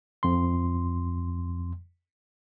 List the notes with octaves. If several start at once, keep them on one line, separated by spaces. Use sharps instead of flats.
F2 C6